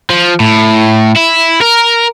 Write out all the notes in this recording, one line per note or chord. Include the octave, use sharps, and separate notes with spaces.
F3
A2
E4
A#4